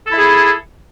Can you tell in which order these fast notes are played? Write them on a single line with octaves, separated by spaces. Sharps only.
A4 E4 G#4